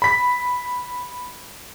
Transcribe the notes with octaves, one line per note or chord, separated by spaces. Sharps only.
B5 B6